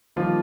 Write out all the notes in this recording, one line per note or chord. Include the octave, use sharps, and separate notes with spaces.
D#3 F3 G3 A#3 F4